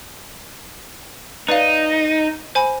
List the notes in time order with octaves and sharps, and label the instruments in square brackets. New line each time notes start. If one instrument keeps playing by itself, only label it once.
[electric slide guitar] D#4 [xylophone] B4 D5 F5
[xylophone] C5 G#5 B5